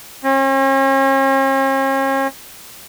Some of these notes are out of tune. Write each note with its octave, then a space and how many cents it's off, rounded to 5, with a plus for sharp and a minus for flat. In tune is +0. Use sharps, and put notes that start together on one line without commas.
C#4 -45